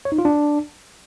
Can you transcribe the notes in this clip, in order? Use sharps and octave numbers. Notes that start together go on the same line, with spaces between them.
C#5
D#4
F4
D4